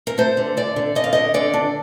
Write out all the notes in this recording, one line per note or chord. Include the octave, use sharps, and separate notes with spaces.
A#4
A3 C5
D3
D3 D5
D3
D3 D#5
F5
D3 D#5
D3 D5
D4